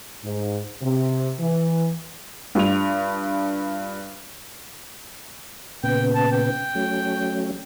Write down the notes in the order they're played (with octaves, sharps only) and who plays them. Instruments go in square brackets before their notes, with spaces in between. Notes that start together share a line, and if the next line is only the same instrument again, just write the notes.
[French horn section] G#2
C3
E3
[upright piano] G2 F4 F7
[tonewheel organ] A#2 C#3 B3 [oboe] G5
[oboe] A5
G5
[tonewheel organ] F#3 A3 C#4